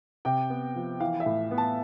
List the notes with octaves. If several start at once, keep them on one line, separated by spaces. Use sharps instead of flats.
C3 G5
B3
F3
E3 F5
E5
A2
B3
A5